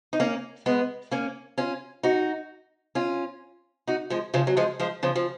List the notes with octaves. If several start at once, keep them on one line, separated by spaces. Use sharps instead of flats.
D#4
A#3 C#4
G#3 B3
A#3 C#4
C#4 F4
D#4 F#4
C#4 F4
D#4 F#4
F3 G#3
C#3 F3
F#3
F3 G#3
F3 G#3
C#3 F3
F3